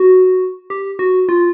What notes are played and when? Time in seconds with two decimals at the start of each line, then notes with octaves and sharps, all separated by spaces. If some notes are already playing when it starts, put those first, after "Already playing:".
Already playing: F#4
0.70 G4
0.99 F#4
1.29 F4